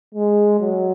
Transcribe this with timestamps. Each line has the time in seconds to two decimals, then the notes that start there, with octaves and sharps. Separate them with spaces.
0.15 G#3
0.60 F#3